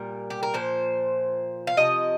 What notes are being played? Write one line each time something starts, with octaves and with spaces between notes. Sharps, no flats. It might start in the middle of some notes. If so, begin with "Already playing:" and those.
Already playing: A#2 G3 A#4
G4
A#4
A#2 F3 C5
F5
C3 F3 D#5